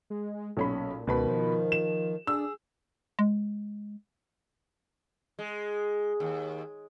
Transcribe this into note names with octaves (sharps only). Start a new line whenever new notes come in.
G#3
B1 A#2 C#4 B5
C#2 B2 D#3 B4 B5
F3
E7
D4 G#4 E6
G#3
G#3
D#2